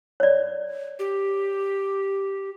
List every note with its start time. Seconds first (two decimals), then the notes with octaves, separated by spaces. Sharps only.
0.20 C#5 D5
0.99 G4